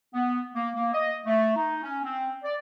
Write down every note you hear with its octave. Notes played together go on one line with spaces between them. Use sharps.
B3
A#3
A#3
D#5
A3
D#4
C#4
C4
D5